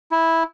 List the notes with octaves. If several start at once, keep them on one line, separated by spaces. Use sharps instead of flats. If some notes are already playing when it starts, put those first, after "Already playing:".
E4